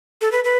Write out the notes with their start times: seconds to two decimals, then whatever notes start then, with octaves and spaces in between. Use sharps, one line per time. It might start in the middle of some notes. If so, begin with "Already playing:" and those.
0.21 A4
0.32 B4
0.44 B4